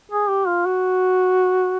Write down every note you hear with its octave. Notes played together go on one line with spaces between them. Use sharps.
G#4
G4
F4
F#4